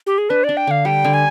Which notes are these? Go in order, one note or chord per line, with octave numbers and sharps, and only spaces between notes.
G4
G#4
D4 B4
D4 D5
G5
D3 F5
G3 G5
D3
G#5